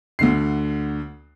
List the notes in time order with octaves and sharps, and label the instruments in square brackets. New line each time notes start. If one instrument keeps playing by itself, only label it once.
[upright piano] D2 D3 C7